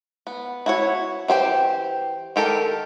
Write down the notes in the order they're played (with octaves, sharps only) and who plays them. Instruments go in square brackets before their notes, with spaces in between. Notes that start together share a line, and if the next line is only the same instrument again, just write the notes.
[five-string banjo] B3
E4 F#4 C#5
E3 G4 C5 G5
D#3 G4 A4 A#4